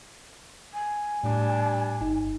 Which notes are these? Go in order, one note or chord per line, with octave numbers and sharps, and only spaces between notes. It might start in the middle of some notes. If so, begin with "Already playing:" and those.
G#5
A2 G3 D4
G1 D#4